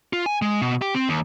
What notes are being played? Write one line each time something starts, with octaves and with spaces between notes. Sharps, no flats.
F4
G#5
G#3
B2
G4
C4
D#2